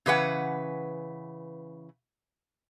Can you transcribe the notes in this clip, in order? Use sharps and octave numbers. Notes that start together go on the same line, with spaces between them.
C#3 E3 B4 F#5